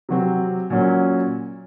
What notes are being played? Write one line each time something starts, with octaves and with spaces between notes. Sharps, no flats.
C3 F#3 C4
A#2 F#3 C#4